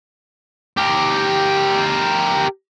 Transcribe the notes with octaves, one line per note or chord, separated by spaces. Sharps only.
G4 A#4